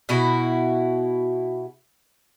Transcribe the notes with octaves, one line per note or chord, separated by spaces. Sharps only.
B2 E4 F#4